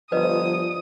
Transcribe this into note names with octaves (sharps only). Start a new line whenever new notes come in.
G1 F3 B4 D5 D#5 D#6